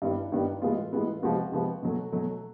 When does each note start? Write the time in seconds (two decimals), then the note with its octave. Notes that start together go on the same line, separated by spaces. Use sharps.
0.02 G2 D#3 G3 B3 E4
0.32 G2 D#3 G3 B3
0.62 A2 E3 G#3 B3 F4
0.93 A2 E3 G#3 B3
1.23 C3 F3 G#3 B3 F#4
1.52 C3 F3 G#3 B3
1.83 B2 F#3 A3
2.12 B2 F#3 A3